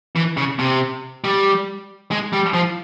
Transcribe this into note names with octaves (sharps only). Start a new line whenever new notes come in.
E3
C#3
C3
G3
G#3
G3
F3